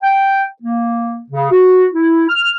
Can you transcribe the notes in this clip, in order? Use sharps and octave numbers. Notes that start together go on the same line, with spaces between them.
G5
A#3
C#3
F#4
E4
F6